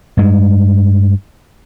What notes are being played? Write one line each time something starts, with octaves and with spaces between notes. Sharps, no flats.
G2 G#3